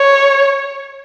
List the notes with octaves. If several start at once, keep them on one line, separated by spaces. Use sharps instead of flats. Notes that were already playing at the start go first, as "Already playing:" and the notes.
Already playing: C#5